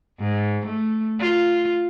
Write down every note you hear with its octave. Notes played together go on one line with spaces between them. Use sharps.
G#2
A3
F4